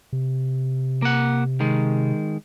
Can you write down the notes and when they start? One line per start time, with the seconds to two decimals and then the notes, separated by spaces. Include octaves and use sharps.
0.13 C3
1.02 A#3 F#5
1.60 D#3 G#3